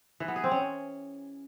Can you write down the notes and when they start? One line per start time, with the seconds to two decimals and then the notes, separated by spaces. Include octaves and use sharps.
0.20 E3
0.28 B3
0.36 G#4
0.44 C4
0.51 C#4